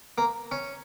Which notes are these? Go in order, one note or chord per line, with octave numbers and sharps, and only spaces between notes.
A#3
C#4